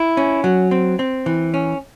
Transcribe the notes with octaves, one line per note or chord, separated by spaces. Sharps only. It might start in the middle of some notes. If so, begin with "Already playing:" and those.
Already playing: E4
C#4
F#3
C4
C4
E3
C#4